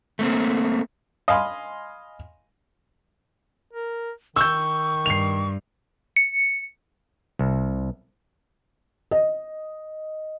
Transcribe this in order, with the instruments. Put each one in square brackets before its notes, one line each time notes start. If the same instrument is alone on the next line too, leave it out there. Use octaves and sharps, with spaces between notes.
[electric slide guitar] A3 A#3 C4
[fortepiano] D#5 F5 G#5 B5 C6
[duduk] A#4
[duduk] D#3 [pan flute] C#6 [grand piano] E6 G6
[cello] G2 [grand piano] C7 F7
[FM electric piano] C#7
[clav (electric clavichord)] C2
[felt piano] D#5